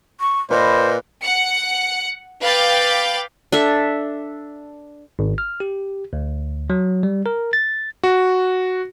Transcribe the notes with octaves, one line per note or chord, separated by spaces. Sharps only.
C#6
A#2 B4 C5 D#5
F#5 C#7
B4 F5 G5 D6 G6 A6
D4 A4 E5
G#1
F6
G4
D2
F#3
G3
A#4
A6
F#4